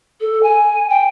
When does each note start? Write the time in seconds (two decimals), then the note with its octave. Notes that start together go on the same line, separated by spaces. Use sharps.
0.21 A4
0.43 G#5
0.90 G5